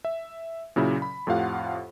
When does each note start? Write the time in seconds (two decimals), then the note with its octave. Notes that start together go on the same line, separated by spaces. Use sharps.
0.05 E5
0.76 A#2 C#3 F#3 E4
1.02 B5
1.27 F2 A2 F4 G4 F5 F#5